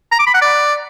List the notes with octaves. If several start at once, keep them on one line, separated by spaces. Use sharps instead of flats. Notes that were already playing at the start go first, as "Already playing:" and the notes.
A#5
D6
B5
F#5
D5